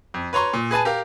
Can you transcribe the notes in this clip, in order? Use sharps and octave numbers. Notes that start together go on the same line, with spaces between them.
F2
B4 C#5 A#5 C6 C#6
A#2
G#4 B4 G#5 A5
G4 A#4 F5